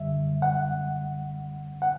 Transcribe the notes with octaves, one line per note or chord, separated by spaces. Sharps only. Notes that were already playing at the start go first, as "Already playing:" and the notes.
Already playing: F#2 D3 G3 E5
F#5
F#5